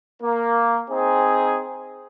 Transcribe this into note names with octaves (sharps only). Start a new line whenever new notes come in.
A#3
C4 D#4 G#4